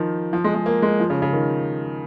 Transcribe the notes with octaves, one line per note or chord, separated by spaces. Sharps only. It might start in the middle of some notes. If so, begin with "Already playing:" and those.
Already playing: D#3 F3
F3
G#3
G#3
A#3
G#3
F3
C#3
C#3
D#3